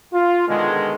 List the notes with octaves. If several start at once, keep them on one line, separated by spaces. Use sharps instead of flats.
F4
B2 D3 D#3 G#3